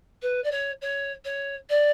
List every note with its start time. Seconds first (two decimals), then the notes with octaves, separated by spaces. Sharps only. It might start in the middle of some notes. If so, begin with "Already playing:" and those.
0.22 B4
0.44 D5
0.51 C#5
0.81 C#5
1.25 C#5
1.69 D5